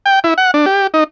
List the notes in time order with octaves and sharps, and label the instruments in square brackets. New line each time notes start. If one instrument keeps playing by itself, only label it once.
[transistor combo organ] G5
E4
F#5
D4
G4
D#4